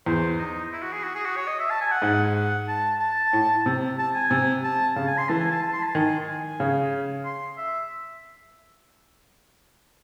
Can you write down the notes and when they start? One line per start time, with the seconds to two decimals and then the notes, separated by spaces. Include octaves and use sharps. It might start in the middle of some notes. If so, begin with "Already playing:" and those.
0.06 E2 C5
0.38 D#4
0.72 E4
0.82 F#4
0.93 G#4
1.04 F#4
1.15 G#4
1.25 F#4
1.36 C#5
1.47 D#5
1.59 E5
1.70 A5
1.81 G#5
1.92 F#5
2.02 G#2
2.35 F#5
2.68 A5
3.00 A5
3.33 A2
3.66 C3
3.99 A5
4.15 G#5
4.31 C3
4.64 A5
4.96 C#3 A5
5.07 G#5
5.18 C6
5.29 E3 A5
5.39 G#5
5.51 A5
5.62 A5
5.73 C6
5.83 A5
5.94 D#3 G#5
6.28 G#5
6.60 C#3
7.25 C6
7.57 E5